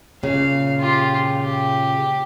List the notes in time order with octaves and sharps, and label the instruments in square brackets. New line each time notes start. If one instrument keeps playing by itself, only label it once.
[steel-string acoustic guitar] A#2 C#3 [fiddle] F5
[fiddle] F4 G4
G4